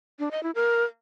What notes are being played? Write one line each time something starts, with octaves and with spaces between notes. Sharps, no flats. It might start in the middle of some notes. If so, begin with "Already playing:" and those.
D4
D#5
E4
A#4